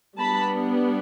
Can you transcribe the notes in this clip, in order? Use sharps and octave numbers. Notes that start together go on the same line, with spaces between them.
G3 B3 D4 A5 B5